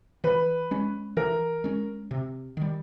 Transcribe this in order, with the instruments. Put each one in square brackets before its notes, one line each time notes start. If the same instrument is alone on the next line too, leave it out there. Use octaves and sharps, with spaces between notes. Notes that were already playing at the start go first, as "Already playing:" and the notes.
[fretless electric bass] E3 [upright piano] B4
[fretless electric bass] G#3 C#4
[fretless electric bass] E3 [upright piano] A#4
[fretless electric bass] G#3 C#4
C3
D#3 G3